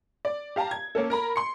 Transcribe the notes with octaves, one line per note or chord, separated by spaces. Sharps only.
D5
G4 F5 A5 A#5
G#6
A#3 C#4 A4
A#4 A#5 B5
C6 C#7